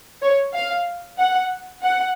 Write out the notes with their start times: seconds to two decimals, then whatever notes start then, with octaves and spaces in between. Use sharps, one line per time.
0.23 C#5
0.54 F5
1.19 F#5
1.84 F#5